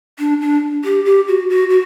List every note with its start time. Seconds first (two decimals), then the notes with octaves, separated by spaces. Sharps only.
0.19 D4
0.41 D4
0.85 G4
1.05 G4
1.28 F#4
1.49 F#4
1.70 F#4